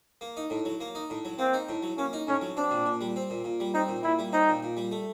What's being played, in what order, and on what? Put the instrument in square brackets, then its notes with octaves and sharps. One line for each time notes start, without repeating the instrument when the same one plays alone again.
[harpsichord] A#3
D#4
A2
F#3
A#3
D#4
A2
F#3
[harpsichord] A#3 [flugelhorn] C4
[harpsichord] D#4
A2
F#3
[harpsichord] A#3 [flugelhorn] C#4
[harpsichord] D#4
[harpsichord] A2 [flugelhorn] C#4
[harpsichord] F#3
[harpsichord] C4 [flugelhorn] D4
[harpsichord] A#2
A#2
G3
C4
A#2
A#2
G3
[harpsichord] C4 [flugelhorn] D#4
[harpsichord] A#2
[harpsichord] A#2 [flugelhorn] E4
[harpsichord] G3
[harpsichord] C4 [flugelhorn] D#4
[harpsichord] A#2
A#2
G3
A3